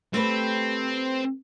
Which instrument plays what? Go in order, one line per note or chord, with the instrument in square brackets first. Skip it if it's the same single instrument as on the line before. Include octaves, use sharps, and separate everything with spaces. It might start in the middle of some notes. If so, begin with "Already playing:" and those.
[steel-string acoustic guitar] A3 G4 B4 [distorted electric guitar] C4